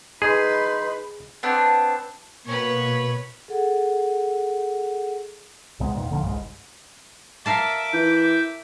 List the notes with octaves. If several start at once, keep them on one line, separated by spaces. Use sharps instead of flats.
D#4 G#4 B4 C6
B3 C4 D4
B2 A#3 B4 C#5
G#4 A4 F#5
C#2 C3 G#3 B3
E2 A#2 D#3
D#1 D3 F3 A#3
G1 C2 G#2
A#4 E5 F5 A5 D6
E3 G6